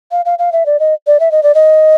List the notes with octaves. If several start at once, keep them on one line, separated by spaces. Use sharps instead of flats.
F5
F5
F5
E5
D5
D#5
D5
E5
D#5
D5
D#5